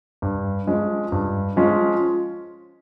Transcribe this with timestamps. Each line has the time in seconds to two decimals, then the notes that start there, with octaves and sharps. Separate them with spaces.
0.22 G2
0.67 F3 G#3 C#4 F4
1.12 G2
1.56 F3 G#3 C#4 F4